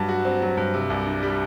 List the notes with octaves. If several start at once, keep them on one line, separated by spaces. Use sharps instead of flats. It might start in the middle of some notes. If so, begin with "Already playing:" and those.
Already playing: G2 F#3
F#4
C4
F#3
G2
C3
C2
D4
G3